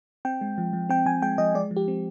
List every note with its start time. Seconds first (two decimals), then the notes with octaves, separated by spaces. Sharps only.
0.25 C4 G5
0.41 G#3
0.58 F3
0.73 F3
0.89 C4 G5
1.06 F3 G#5
1.22 G#3 G5
1.38 F3 D#5
1.55 G#3 D5
1.71 F3
1.76 G4
1.88 C4